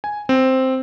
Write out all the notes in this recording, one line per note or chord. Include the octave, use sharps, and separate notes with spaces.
G#5
C4